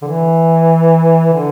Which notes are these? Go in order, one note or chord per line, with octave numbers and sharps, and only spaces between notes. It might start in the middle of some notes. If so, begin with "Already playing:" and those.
D3
E3
D3